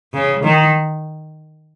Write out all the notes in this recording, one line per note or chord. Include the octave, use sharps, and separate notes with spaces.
C#3
D#3